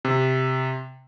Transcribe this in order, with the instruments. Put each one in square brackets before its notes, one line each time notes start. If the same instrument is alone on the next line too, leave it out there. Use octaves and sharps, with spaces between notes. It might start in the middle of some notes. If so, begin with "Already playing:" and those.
[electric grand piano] C3